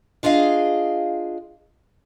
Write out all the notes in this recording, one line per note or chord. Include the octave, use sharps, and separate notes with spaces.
D4 F4 G#4 D#5 F5